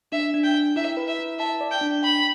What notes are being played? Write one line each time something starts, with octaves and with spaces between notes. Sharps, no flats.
D4 E5
D4
G5
G5
E4 E5
B4
E5
E4
E5 A5
D5
G5
D4
G5 B5